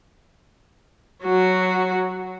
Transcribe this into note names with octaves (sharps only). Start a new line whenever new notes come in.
F#3 F#4